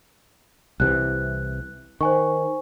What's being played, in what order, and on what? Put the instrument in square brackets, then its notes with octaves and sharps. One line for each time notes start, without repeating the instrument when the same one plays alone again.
[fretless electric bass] C2 C3 E3 [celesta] F#6
[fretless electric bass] D#3 [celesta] C5 G#5 C#6